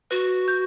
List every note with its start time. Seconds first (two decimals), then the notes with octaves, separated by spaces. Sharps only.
0.11 F#4 B4
0.48 G6